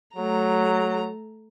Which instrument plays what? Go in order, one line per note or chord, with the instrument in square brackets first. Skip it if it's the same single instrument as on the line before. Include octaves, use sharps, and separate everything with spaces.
[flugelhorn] F#3 [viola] A3 A#5